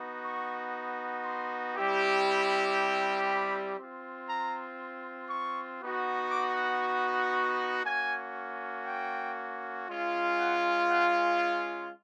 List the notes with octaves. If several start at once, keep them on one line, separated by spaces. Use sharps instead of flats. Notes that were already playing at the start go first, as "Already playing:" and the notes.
Already playing: B3 D#4 F#4
C#6
C6
G3 C4 E4 G4
B5
B5
C4 F4
A#5
C#6
B3 D#4 F#4
D6
C#6
A#3 C#4 F#4 G#5
G5
G#3 C#4 F4
F#5
F#5
F5